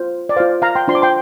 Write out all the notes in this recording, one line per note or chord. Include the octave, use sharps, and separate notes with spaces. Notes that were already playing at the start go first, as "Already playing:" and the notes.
Already playing: F4 C5
D5
F4 C5 F5
F5 A#5
G5 C6
D4 F4 C5 C6
D6
G5 C6